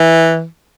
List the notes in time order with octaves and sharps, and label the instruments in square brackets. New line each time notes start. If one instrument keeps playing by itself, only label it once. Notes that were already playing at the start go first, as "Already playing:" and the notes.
Already playing: [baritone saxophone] E3